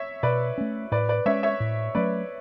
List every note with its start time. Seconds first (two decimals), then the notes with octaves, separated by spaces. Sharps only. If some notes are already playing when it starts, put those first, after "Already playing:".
Already playing: C#5 E5
0.23 B2 B4 D5
0.58 A3 C#4
0.92 A2 B4 D5
1.09 B4 D5
1.26 G#3 C#4 C#5 E5
1.43 C#5 E5
1.60 A2
1.95 F#3 A3 C#4 B4 D5